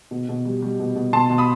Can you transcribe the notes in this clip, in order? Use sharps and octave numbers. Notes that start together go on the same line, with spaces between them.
B2
B2
G3
G3
B2
B2
B2 A5 C6
B2
B5 D#6